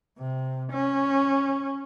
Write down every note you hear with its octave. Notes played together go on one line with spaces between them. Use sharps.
C3
C#4